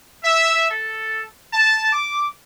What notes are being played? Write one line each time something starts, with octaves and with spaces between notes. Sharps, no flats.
E5
A4
A5
D6